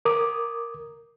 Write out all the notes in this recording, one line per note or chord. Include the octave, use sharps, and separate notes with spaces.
A#4 D6 D#6